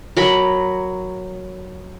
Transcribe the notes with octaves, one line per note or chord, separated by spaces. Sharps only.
F#3 A#4 B5